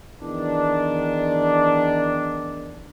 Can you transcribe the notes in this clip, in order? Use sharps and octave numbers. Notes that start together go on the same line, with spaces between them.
E2 D#3 D4